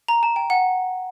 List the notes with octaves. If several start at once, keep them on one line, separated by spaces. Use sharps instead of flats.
A#5
A5
G5
F#5